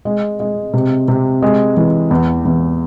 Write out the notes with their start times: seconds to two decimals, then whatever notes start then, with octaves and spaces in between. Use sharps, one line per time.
0.05 G#3
0.40 G#3
0.73 C3
1.08 C3
1.42 G#3
1.77 E3
2.11 E2
2.45 E2